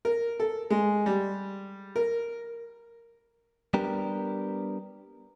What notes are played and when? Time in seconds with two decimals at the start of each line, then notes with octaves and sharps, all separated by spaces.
0.05 A#4
0.40 A4
0.70 G#3
1.06 G3
1.96 A#4
3.74 G3 B3 D4 G4 A#4